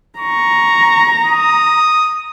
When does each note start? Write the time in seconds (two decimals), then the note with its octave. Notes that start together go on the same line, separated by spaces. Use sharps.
0.19 A#5 C#6
1.26 D#6